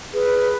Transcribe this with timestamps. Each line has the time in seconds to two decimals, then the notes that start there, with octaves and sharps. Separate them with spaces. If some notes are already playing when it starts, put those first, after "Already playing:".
0.13 G#4 B4